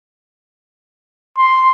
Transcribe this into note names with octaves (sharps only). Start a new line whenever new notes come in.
C6